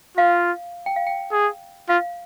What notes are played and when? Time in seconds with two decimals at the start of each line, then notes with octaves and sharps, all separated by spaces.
0.17 F4 F5
0.86 G5
0.96 F5
1.07 G5
1.32 G#4
1.89 F4 F5